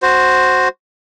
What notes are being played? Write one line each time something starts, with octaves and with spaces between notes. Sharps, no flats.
F#4 C5